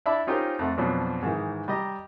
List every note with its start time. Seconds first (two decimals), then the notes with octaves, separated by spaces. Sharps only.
0.06 D4 E4 D5 E5 A5 B5
0.27 C#4 D#4 F4 G4 A#4 C5
0.59 F2 A3 F#5
0.77 F2 B2 F3 F#3 C#4 D4
1.23 G#2 D#3 E3
1.68 G3 G4 D#5 A#5